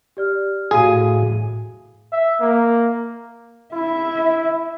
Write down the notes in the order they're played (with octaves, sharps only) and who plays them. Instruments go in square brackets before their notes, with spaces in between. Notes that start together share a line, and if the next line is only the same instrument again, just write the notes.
[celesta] G4 D5 F6
[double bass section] A2 [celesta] F#4 F5 D#7 [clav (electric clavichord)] G#4
[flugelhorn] E5
A#3
[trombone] E4 [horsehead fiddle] E5